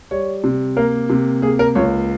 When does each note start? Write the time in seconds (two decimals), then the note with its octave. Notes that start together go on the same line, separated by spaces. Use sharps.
0.11 G3 C#5
0.44 C3
0.77 A#3 A#4
1.10 C3
1.42 A#3 G#4
1.59 A#4
1.75 C#2 C#5